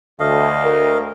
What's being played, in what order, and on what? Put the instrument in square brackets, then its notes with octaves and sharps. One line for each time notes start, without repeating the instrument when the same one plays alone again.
[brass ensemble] D2 [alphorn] A3 [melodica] D#5 F5
[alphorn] A#4